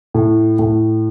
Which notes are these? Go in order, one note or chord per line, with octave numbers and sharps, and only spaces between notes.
A2
A2